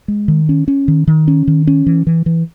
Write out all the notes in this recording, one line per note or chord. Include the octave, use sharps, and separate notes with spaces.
G#3
D#3
C#4
C#4
D#3
D#3
C#4
D#3
C#4
E3
E3
E3